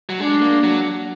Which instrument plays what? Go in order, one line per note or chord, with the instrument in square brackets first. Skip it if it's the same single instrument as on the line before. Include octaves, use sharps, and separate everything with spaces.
[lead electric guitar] F#3
[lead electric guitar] G#3 [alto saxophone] D4
[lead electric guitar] A#3
F#3